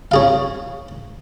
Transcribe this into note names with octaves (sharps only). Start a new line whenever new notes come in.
C#4 G#4 F5